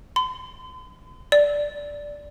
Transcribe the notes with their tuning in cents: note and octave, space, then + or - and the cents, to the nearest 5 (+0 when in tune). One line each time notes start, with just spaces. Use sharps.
C6 -45
D5 -5